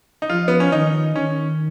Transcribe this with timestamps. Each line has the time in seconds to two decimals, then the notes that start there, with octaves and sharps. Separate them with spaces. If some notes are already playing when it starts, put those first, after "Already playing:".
0.22 D#4
0.30 F3 F4
0.48 B3
0.60 C#4
0.72 D#3 D#4
1.15 D#3 C#4